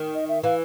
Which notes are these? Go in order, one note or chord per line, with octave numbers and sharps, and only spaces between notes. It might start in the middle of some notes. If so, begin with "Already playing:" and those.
Already playing: D#3
D#5
E5
E3 F5